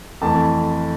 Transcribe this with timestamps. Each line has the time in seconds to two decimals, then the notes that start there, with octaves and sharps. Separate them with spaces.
0.21 F2 E3 A3 A5